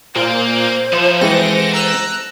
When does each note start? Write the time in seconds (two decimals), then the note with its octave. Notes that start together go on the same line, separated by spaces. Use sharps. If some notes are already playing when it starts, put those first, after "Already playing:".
0.16 A#2 A#3 C5
0.93 F3 D#4 E4
1.21 E3 G#3 C4 A4 F#5 A#6
1.74 A#5 E6 F#6